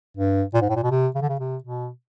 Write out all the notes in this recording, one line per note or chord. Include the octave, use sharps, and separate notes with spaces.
G2
A#2
G#2
A2
A#2
B2
C3
C#3
D3
C#3
C3
B2